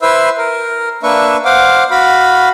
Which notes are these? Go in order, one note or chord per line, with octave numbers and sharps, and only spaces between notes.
E4 B4 C5 E5 E6
A#4
A#3 D4 B4 E5 C#6
C5 F5 F#5 D6
F#4 F5 B5